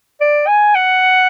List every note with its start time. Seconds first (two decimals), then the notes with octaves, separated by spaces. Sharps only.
0.21 D5
0.47 G#5
0.75 F#5